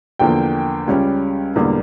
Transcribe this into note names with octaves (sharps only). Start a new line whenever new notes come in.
E2 D3 F3 A#3 G5
C#2 C#3 G3 C#4
E1 E2 D3 G3 A#3